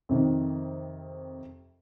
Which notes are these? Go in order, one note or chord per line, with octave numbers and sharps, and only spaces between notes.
F2 C3 D#3